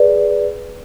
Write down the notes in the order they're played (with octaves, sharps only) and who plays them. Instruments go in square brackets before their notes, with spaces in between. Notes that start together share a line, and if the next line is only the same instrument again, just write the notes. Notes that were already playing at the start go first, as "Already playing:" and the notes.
Already playing: [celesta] G#4 B4 D5